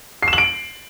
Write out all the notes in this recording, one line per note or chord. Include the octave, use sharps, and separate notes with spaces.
C7
E7
F#7
D7